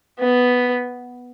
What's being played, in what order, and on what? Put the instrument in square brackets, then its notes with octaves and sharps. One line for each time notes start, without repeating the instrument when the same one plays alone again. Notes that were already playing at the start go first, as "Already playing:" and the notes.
[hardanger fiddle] B3